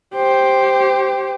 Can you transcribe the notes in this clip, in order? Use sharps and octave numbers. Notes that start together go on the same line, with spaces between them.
G4 C5